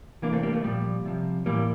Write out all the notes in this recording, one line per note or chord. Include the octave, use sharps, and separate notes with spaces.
C3 E3 A#3 D4
A3 C4
G3 A#3
A3
A#2 F3 G3
C3 F3
A2 E3 G3 A#3